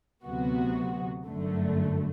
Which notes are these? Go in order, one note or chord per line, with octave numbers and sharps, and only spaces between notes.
D2 C3 F#3 B3 F#4
G1 F#2 D3 A3